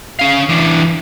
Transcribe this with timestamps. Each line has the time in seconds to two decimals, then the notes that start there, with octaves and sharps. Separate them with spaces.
0.19 C#4 F5
0.49 E3 D4